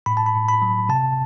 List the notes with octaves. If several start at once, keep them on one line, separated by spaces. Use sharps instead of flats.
A2 B5
A5
B5
A2
B5
F#3
C3 A5